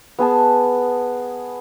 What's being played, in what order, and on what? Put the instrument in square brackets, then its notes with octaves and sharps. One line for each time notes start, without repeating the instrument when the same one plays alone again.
[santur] B3 G#4 A5